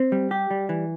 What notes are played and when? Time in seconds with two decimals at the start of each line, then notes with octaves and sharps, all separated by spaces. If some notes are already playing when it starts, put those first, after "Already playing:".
Already playing: C4
0.12 G3
0.31 G4
0.51 G3
0.69 E3